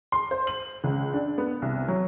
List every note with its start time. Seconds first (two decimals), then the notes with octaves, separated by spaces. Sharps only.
0.12 C6
0.31 C5
0.47 F#7
0.84 C#2
1.14 D4
1.38 B3
1.62 C2
1.88 F#3